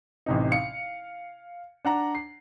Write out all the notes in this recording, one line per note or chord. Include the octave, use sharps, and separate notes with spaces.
A1 C3 D#4
F5 C#7
D4 F#5 A#5
C7